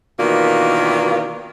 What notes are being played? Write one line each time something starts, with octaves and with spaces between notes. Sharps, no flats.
B2 D#3 E3 A#3 D4 F4